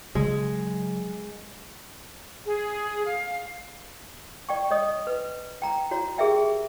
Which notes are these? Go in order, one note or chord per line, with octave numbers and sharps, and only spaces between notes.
C#3 F#3 G#3
G#4
F5
D5 G5 C#6
C#5 D#5 D#6
B4
G5 A#5
F#4 C#5 A#5
G4 G#4 A#4 E5 G5